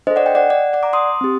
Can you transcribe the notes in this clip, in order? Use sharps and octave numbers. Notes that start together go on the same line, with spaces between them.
D4 A4 C5 D#5
D5 F#5
D#5 G5
D5 F#5
D5
D5 F#5
A#5 D6
C6 D#6
C4 G4